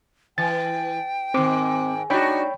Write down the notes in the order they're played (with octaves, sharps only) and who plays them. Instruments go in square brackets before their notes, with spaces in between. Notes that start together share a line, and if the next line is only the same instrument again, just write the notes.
[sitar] E3 [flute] G5 [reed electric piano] A6
[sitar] G#2 D#3 [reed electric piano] C4 D6
[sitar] D4 F#4 [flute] D#4 [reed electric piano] C#5 G5 B5